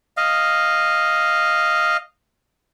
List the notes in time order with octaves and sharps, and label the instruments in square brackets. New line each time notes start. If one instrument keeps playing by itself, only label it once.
[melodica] D#5 F5